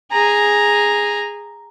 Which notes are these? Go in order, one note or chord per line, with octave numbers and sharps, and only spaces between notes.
G#4 A#5